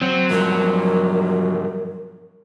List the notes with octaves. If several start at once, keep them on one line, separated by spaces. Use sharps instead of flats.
F#3 C4
G2 F3 A#4